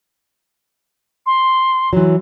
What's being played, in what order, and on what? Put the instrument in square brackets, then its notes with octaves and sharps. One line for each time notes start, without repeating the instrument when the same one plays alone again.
[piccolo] C6
[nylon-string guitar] E3 F#3